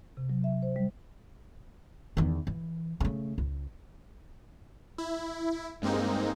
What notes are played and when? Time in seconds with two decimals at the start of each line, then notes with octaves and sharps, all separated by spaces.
0.17 C3
0.30 F#3
0.44 E5
0.62 C5
0.76 G3
2.17 E2 D#3
2.47 E3
3.00 C#3 A3
3.38 C#2
4.98 E4
5.82 G2 G#3 A#3 C4 D#4